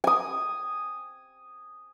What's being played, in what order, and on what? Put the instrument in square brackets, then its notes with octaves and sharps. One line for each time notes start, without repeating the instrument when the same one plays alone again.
[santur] G#5 D#6